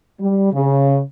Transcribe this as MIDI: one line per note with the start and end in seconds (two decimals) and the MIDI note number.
0.20 0.51 55
0.53 1.00 49